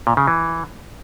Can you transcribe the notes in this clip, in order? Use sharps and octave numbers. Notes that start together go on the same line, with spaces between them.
A#2
C#3
E3